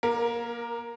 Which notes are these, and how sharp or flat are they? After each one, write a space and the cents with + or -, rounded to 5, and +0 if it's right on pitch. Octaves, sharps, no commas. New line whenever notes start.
A#3 +25 A#4 +0